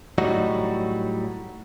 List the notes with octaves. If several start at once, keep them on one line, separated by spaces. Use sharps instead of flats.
A2 F#3 G3 D#4 F#4